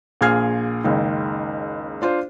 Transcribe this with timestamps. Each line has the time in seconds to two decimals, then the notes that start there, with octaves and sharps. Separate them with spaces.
0.21 A#1 A#2 G#4 F6 G#6 C7
0.84 F#1 C#2 D#3
2.02 D4 F4 C5